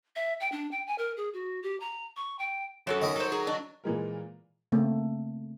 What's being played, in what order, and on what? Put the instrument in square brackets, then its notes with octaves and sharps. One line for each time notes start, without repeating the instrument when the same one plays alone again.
[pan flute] E5
G5
D4
G5
G#5
A#4
G#4
F#4
G4
A#5
C#6
G5
[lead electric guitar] F#2 [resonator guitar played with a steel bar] F#3 F#4 A4 [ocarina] C#5
[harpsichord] D#3 D#4 B5 [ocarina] C#5
[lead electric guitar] F#3 [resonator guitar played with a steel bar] A4 C5
[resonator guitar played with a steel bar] G#4 [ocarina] A#5
[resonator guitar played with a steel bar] D4 [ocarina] D#5
[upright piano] A#2 E3 G#3 A#4
[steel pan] C#3 A3 A#3 C4